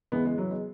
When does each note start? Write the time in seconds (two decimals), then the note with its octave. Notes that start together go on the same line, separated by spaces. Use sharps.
0.12 E2 C#3 E3 G#3 B3
0.25 G#3
0.38 F#3
0.51 G#3